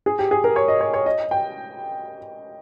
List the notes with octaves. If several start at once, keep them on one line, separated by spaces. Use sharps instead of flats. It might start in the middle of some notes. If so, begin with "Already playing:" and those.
G#4
G4
G#4
A#4
C#5
D#5
C#5
C#5
D#5
G5